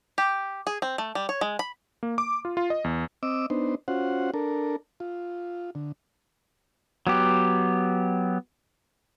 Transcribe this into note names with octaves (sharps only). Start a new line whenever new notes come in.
G4
G#4
C4
A3
G3
C#5
G#3
B5
A#3
D6
F4
F4
D#5
E2
C4 D#5 D6 E6
B3 D4 D#4 C5
C#4 F4 F#4 C5 F#5
D4 A4 A#4
F4
D3
F#3 B3 G4